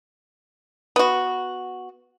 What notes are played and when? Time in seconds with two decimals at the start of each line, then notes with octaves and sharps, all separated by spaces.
0.96 B3 F#4